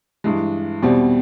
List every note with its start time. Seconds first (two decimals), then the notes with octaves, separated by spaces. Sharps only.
0.24 G2 E3 G#3
0.82 E2 B2 G3 C4